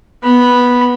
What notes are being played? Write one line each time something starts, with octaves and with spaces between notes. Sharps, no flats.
B3 B5